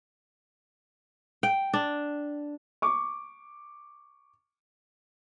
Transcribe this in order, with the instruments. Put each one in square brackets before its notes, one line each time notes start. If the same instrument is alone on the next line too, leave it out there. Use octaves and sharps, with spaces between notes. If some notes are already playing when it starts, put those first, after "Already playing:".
[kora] G5
D4
[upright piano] C#6 D6